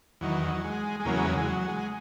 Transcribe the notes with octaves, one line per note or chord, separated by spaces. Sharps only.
E2 D#3 F#3
F#3
G#3
G#3
E2 C#3 F#3 A#3
G#3
F#3
G#3
F#3
G#3